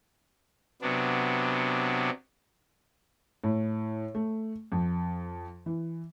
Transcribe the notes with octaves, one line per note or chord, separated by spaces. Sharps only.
C3 F#3 B3 D4
A2
A3
F2
E3